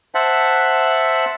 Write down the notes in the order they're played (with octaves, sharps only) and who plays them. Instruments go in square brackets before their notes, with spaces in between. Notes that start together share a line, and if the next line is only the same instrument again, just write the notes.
[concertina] C5 E5 F#5 A5